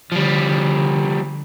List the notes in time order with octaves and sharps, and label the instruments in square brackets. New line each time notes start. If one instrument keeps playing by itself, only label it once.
[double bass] D3 [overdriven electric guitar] F3 G3